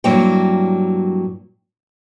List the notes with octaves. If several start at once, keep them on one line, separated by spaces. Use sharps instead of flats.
G2 F#3 A#3 E4 C#5 G5